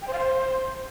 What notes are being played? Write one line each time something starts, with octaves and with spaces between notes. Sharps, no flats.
G5
C5
F5
C5